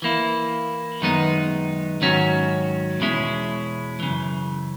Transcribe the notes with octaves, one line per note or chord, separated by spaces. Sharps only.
E3 A#3 E4
F#2 D#3 G#3 B3 D#4
G#2 D#3 F#3 C#4 F#4
E2 B2 G#3 C#4 E4
F#2 C#3 E3